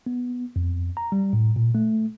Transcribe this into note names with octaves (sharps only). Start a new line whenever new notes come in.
B3
F2
A#5
G3
A2
A#2
A3